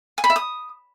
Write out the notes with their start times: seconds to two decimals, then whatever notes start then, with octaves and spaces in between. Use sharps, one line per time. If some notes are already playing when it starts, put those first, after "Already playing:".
0.18 G#5
0.24 B5
0.30 E5
0.36 D#6